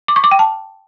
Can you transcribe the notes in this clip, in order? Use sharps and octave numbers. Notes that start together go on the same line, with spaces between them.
D6
C#6
D6
G5
A5